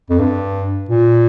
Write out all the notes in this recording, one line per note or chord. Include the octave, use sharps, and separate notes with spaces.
F2
G2
A#2